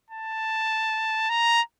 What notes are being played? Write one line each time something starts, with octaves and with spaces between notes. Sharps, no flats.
A5
A#5